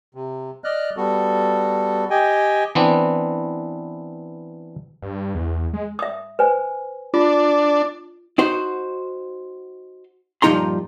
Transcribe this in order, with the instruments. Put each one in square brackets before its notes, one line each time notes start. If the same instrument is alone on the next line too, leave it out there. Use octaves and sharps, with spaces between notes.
[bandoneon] C3
D5 D#5 F6 F#6
G3 B3 F#4 A4
G4 D#5 G5 G#5
[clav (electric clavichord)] E3 B3 C4 D4
[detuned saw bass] G2
E2
G#3
[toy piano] E5 D#6
B4 C5 G#5
[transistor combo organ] D4 [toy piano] F4
[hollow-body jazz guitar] D#4 F#4 C5
G2 A#2 F3 D#4 A#5 C6